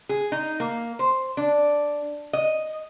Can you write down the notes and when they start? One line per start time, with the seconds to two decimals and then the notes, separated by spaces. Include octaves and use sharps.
0.09 G#4
0.32 D#4
0.60 A#3
0.99 C5
1.37 D4
2.33 D#5